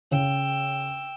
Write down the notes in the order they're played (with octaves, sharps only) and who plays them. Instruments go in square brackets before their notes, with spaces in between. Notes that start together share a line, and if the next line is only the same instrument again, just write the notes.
[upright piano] C#3 [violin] G5 E6